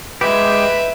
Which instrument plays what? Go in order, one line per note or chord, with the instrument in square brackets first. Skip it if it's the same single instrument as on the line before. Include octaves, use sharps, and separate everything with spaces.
[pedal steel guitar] G#3 G4 [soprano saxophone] B4 [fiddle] E5